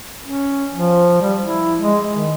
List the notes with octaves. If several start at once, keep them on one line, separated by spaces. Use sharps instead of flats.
C#4
F3
G3
E4
G#3
D#3